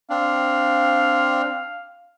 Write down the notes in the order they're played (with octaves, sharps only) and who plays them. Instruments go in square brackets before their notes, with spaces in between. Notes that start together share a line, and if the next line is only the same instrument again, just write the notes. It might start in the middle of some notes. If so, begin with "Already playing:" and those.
[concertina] C4 D4 [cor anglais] F5